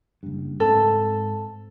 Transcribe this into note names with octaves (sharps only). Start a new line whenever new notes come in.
F#1 G2
G#2 C4 A4